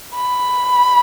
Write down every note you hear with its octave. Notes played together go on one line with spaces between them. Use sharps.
B5